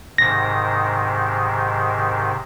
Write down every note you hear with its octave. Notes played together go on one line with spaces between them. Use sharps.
G#2 C3 D#3 A#6